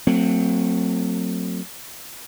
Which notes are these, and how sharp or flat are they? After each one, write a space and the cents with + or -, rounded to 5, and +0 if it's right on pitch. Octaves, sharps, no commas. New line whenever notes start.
F#3 -20 A3 +35 C4 +0